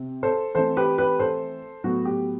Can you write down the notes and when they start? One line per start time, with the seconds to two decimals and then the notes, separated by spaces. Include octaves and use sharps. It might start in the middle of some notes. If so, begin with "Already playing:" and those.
Already playing: C3 C4
0.23 A4 C5
0.55 E3 A3 C4 A4 C5
0.77 G4 B4
0.98 G4 B4
1.20 A4 C5
1.84 A2 F#3 B3 F#4
2.05 G4